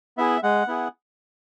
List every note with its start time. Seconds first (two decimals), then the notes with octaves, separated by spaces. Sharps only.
0.18 B3 E4 G#4 E5
0.43 G#3 F#5
0.67 B3 E4 G#4